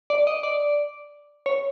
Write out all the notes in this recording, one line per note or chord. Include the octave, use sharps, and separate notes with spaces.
D5
D#5
D5
C#5